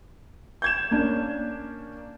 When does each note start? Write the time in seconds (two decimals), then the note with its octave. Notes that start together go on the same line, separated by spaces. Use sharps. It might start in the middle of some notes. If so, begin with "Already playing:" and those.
0.62 G6 G#6 E7
0.91 A#3 C#4 D4